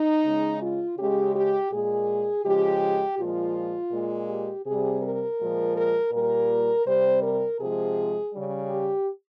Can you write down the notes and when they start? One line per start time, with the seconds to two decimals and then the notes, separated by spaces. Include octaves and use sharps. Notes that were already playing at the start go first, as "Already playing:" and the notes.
Already playing: D#4
0.24 C#3 G#3
0.61 F4
0.98 C#3 G#3 G4
1.34 G4
1.71 A#2 G#3 G#4
2.44 C#3 F3 G#3 G4
3.18 A#2 F3 G#3 F4
3.92 A#2 G#3
4.28 G4
4.66 C3 G3 G#4
5.02 A#4
5.39 A#2 F3 G#3
5.76 A#4
6.12 A#2 G3 A#4
6.86 C3 G3 C5
7.22 A#4
7.59 C3 F3 G#3 G#4
8.33 C#3 G3
8.69 G4